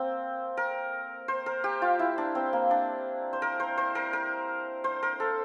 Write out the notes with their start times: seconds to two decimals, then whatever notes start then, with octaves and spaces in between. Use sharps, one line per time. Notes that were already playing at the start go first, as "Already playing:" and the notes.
Already playing: A#3 C4
0.57 A#4
1.28 C5
1.46 A#4
1.64 G4
1.82 F4
1.99 E4
2.18 D4
2.35 C4
2.53 A#3
2.71 D4
3.33 C5
3.42 A#4
3.60 C5
3.78 C5
3.95 A#4
4.13 A#4
4.84 C5
5.03 A#4
5.20 A4